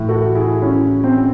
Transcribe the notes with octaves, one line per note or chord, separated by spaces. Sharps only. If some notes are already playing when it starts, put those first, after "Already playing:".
Already playing: A2 E3
F#4 A4
E4 G#4
C#4 E4
C4
C#4